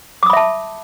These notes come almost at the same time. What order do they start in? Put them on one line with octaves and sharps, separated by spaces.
D6 D#6 B5 E5 A5